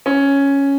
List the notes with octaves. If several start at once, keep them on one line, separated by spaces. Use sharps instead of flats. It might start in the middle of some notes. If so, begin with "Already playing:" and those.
C#4